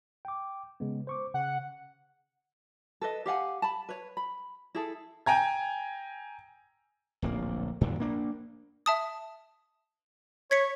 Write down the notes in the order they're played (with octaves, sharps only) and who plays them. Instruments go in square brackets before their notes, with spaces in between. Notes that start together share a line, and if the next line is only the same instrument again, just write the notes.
[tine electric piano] G5 D6
C#3 G#3 B3
C5 C#6 D6
[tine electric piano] C#3 [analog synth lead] F#5
[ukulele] A4 B4 D#5
G4 F5 F#5 G#5
A5 B5
B4 C#5
B5
E4 G#4 A4
[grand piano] G5 G#5 A#5 G#6
[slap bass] D1 A#1 A#3
F#2 A#2 D3 D#3
A#3 D4
[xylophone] E5 A5 D#6
[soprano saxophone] C#5 [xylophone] G#6 B6 C#7